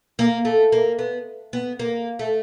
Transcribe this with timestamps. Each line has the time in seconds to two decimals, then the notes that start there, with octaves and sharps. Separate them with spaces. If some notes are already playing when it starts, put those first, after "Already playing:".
0.19 A#3
0.45 A3
0.72 A#3
0.99 B3
1.53 B3
1.79 A#3
2.19 A3